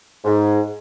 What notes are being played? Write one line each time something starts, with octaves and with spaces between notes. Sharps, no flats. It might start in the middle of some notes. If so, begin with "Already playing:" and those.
G#2